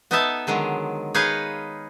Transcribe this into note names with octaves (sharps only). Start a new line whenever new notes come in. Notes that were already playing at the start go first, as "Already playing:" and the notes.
B3 D#4 A4 D#5 E5 A5
D3 D#3 F#3 G#3
D#4 G#4 B4 C#5 D#5 F5